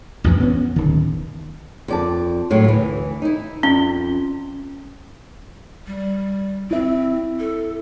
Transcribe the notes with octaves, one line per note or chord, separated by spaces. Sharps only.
A1 F2 E3
B3 C#4
D1 D#3
F2 D5 A5
A2 F#3
D2 E3
D#4 E4
F2 C#4
G3
C4 E4 E5
A4